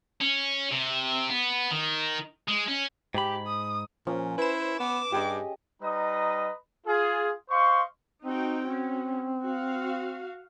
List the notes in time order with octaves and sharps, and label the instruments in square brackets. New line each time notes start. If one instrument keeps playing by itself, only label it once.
[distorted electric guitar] C#4
C3
B3
D#3
G#3
C#4
[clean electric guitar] G#2 B5 [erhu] G4
[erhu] D#6
[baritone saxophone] A#2 [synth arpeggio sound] F3 [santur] C#4
[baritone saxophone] E4 [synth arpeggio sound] B4 E7 [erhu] C5
[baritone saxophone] B3 [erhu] D6
[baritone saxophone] G2 [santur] G4 G#4 D#5
[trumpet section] G3 D#4 B4 D#5 A#5 D#6
F4 G#4
C5 D#5 F5 C6 C#6
[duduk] C4 [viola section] D#4 F#4 G5
[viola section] C#4 F#4
F#4 F5